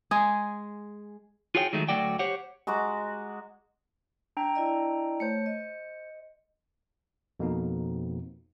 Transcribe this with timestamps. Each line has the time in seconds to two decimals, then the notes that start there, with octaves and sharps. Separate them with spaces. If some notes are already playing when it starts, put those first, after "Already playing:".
0.11 G#3 G#4
1.55 F4 F#4 G#4 C#5 D5 G5
1.73 D#3 F#3 G#3 A3
1.88 D2 F#3 A3 F#4 D5 G5
2.19 G4 C5 C#5 F#5
2.67 G#3 F#4 A#5 D6
4.37 D4 G5 A#5
4.55 E4 D5 D#5
5.20 A3 C5 C#5 C#7
5.46 D#5
7.40 F2 B2 A#3 D#4